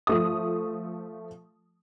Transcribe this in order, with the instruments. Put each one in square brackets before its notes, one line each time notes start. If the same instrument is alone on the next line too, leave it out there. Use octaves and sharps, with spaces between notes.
[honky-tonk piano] F3 A3 D#6